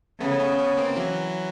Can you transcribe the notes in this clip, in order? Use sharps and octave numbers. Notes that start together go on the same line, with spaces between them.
C#3 A3 B3
B3 C#4
B3 C#4
A#3 C4
E3 F#3